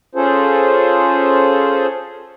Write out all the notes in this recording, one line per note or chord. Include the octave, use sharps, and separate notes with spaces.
C#4 F4 G#4 A4 C5